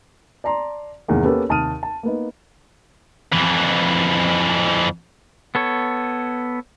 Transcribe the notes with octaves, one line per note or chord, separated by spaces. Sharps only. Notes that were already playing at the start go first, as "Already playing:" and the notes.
D5 A5 A#5 C6
E2 G#2 C3 D#3 G#3 A#3
A#3 B3 C#4 G4 A4 A#4
D#2 C3 A5 D#6 F6 D#7
A5
A#3 B3 D#4
F2 E3
B3 A4 C#5